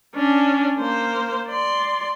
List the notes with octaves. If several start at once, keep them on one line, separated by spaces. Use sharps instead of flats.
C#4 D4
A#3 C5
D5 C6